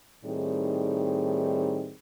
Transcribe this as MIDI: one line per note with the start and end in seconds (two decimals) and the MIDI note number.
0.25 1.94 45
0.25 1.94 51
0.25 1.94 55
0.25 1.94 60
0.25 1.94 63
0.25 1.94 68